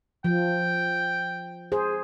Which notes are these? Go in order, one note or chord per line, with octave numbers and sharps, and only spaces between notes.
F3 G5
G#4 C5